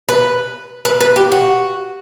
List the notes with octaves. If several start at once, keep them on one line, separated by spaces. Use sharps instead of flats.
B4
B4
B4
G4
F#4